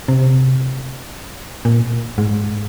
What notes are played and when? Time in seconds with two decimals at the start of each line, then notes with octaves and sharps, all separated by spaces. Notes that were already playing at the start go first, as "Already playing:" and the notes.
0.08 C3
1.65 A#2
2.18 G#2